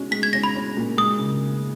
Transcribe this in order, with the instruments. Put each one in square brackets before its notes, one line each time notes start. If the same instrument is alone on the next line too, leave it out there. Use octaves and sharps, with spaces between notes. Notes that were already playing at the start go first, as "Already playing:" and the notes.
Already playing: [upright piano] G#3 C#4 F#4
[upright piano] G#3 [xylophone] B6
[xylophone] G#6
[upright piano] C#4 [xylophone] A#6
[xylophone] B5
[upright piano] C#4
A#2
[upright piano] G#3 [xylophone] D#6
[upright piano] C#3